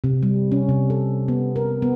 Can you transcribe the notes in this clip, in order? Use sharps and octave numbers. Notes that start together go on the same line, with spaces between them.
C3
G3
C#4
C3
A4
B3
A#4
B3